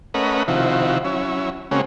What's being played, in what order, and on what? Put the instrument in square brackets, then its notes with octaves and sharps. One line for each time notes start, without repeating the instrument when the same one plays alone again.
[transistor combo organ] A3 C#4 A#4 B4 D#5 F#5
C3 D#3 F3 E4 F#4
F#3 C#4 E4
C#3 G#3 A#3 C4 C#4 F#4